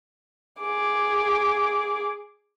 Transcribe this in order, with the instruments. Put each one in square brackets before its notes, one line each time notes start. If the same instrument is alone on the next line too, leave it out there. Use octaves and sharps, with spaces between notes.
[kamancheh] G#4 D6